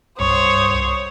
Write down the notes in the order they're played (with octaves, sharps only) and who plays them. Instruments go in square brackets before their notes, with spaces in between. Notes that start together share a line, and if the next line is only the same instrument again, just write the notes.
[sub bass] C2 [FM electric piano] G2 C#6 [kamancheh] C5 D#6 [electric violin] C#5